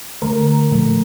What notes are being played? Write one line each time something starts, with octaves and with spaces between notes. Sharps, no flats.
D3 A3 A#4
A#2 F3 A3